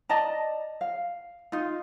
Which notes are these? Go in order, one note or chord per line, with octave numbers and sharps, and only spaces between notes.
D5 D#5 A5 A#5
F5
D#4 F4